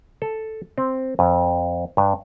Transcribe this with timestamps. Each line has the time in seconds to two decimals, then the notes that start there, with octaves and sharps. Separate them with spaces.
0.22 A4
0.78 C4
1.19 F2
1.97 G2